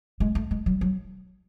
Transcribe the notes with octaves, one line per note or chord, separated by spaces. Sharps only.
G#3
A3
G#3
F#3
F#3